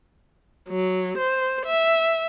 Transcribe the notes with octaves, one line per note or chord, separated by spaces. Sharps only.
F#3
C5
E5